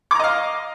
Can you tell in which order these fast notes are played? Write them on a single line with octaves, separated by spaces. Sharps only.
D6 A#5 D#5 F5